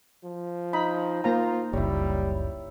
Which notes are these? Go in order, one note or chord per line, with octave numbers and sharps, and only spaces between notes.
F3
D#4 B5
A#3 F4 C5 A#5
F#1 C#2 G3 E4 C#5